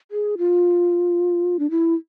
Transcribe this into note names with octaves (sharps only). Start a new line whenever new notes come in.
G#4
F4
D4
E4